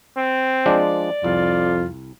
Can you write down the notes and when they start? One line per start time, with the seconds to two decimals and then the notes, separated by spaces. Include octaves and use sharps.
0.17 C4
0.66 F3 G#3 D4 D5
1.24 C2 F2 F4